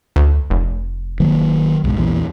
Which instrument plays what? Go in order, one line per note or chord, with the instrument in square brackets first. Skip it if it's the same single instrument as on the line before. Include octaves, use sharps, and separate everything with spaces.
[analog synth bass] D2
F1
[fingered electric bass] D#3 F#3 A#3
B1 G#2
A#1 E2 E3